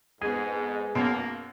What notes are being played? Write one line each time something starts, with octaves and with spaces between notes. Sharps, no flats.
F2 G#2 G#3 B3 G#4 G#5
G#1 F#2 B2 A#3